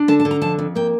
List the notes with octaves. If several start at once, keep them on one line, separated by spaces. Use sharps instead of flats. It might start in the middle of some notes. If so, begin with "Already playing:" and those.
Already playing: D4
D3 A5
A5
D3
A#5
F2 A5
F2
A#3 G5